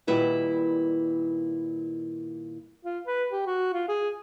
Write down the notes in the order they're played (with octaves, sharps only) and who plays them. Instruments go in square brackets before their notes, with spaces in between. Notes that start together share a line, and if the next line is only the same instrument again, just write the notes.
[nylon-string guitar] A#2 D#3 G3 E4 B4 F#5
[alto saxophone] F4
B4
G4
F#4
F4
G#4